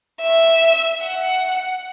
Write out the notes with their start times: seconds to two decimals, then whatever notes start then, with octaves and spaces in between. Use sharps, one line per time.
0.22 E5
1.02 F#5